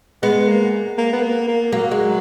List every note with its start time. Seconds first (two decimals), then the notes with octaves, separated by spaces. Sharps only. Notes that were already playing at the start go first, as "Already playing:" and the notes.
0.23 G#3 B3
0.48 A#3
0.98 A#3
1.13 B3
1.22 A#3
1.48 A#3
1.72 F#3 A#3
1.91 G#3